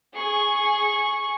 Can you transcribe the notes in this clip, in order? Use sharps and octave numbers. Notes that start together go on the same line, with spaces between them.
G#4 C#6